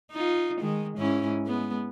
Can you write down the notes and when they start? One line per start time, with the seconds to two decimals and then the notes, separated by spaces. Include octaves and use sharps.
0.12 D#4 F4
0.61 D#3 G#3
0.98 G#2 C#4 E4
1.46 G#3 B3